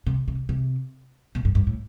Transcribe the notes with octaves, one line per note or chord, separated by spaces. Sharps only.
C3
C3
C3
B2
G2
G2
A2